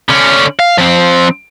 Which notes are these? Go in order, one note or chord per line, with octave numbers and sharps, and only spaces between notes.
D3 C#4
F5
F3 C4